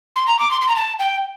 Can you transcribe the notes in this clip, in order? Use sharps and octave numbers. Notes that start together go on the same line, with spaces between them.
C6
A#5
D6
C6
C6
A#5
A5
G5